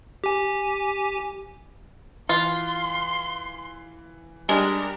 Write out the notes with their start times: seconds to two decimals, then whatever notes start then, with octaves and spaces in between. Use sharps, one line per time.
0.24 G4 G#5
2.29 E3 F4 C6
4.49 G3 G#3 D4 G4 A#4